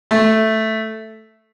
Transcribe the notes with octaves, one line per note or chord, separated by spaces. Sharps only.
A3